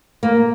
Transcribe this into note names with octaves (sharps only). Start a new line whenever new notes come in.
A#3